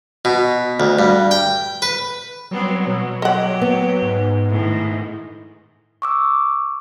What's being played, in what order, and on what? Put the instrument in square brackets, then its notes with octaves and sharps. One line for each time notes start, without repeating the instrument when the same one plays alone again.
[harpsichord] B2
D2
G2
G5
B4
[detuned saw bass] F#3 [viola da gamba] G3 B3 C4
[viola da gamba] B2
[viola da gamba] G4 [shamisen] D#5 F#5
[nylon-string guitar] B3
[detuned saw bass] G#2
[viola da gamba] A2 D#3
[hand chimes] C#6 D6 E6